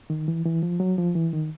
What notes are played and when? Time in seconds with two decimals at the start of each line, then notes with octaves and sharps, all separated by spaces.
0.10 D#3
0.28 E3
0.45 E3
0.63 F3
0.80 F#3
0.98 F3
1.15 E3
1.33 D#3